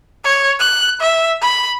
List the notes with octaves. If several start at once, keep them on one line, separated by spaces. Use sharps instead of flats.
C#5
F#6
E5
B5